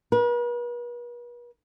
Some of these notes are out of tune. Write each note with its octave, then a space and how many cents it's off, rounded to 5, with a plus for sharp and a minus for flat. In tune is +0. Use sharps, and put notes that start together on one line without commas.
B4 -45